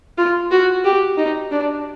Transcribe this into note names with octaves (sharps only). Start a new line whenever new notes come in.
F4
F#4
G4
D#4
D4